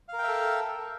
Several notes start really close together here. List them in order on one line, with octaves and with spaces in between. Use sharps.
F5 A#4 G5 E5 A4